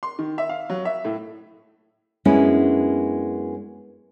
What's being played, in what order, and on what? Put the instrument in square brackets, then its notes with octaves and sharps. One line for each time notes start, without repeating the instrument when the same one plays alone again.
[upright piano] C6
D#3
E5
F5
F#3
E5
A2
[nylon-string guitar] F#2 G#3 B3 C#4 D4 E4